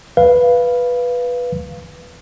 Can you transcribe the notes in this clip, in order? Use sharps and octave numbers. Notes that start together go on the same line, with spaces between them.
B4 F5